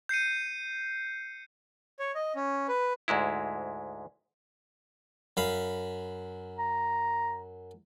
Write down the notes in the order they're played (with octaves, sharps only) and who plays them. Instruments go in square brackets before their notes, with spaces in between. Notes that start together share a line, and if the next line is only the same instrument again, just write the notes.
[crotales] G6 C7 C#7 D#7
[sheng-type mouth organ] C#5
D#5
C#4
B4
[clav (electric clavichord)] D2 G#2 G#3 E4
[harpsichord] F#2 F5 B5
[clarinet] A#5